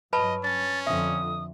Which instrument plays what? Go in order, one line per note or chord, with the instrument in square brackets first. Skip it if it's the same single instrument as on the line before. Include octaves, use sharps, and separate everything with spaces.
[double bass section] G2 F#3 [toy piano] B4 A5 B5 [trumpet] D#5
[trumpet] C#4 [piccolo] A6
[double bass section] F2 D3 F3 [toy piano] E5 [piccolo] D#6